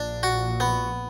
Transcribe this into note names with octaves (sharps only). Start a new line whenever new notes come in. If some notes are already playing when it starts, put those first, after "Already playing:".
Already playing: A#1 A#2 D4
F#4
B3